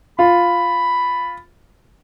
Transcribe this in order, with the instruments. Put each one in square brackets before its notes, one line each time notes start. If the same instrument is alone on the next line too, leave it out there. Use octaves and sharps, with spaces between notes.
[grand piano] F4 [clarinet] B5